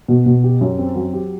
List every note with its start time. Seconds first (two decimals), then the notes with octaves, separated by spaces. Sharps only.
0.08 B2
0.26 B2
0.44 G4
0.61 F#2
0.79 C4
0.96 F#3
1.13 G4